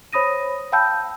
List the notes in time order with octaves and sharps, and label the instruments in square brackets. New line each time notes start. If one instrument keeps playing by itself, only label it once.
[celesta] C5 C#5 B5 D#6 A#6 D#7
F5 G5 A5 B5 E6 G6